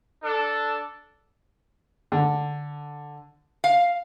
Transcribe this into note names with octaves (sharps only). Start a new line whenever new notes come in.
D4 A4
D3
F5